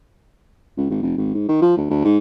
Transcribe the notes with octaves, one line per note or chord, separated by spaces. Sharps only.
C#2
G#1
F1
G#1
G#2
D#3
F3
D2
D2
G#2